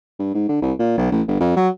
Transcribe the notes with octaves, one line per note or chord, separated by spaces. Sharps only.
G2
G#2
D3
C2
A#2
B1
A1
G1
F2
F#3